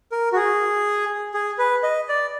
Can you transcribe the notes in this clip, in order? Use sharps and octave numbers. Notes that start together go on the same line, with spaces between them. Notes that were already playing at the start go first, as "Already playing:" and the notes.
A#4
F#4
G#4
G#4
B4
D#5
D5